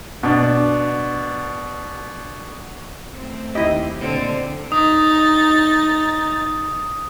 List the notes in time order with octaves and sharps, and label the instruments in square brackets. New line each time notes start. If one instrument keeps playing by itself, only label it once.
[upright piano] B2 D4
[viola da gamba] A3 C4
[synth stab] D#2 E4 G4 [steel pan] D#5
[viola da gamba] A#2 D3 C4
[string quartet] D#4 A6 [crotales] D#6